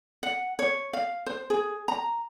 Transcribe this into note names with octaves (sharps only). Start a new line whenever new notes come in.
F#5
C#5
F5
C5
G#4
A#5